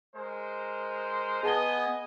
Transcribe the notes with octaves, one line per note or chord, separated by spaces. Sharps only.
G#3 A#4 C5
B3 G#4 D#5 G#5 A5 G7